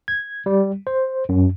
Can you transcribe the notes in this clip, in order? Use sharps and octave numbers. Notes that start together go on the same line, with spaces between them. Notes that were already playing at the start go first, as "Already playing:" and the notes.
G#6
G3
C5
F#2